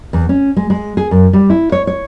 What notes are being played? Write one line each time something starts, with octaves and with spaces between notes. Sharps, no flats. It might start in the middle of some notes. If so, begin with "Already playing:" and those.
E2
C#4
G#3
G#3
G#4
F#2
G3
E4
C#5
C#5